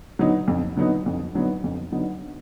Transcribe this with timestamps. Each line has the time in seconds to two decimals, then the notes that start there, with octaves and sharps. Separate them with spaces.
0.19 D3 F#3 B3 D#4
0.48 F2
0.77 D3 F#3 B3 D#4
1.06 F2
1.34 D3 F#3 B3 D#4
1.64 F2
1.92 D3 F#3 B3 D#4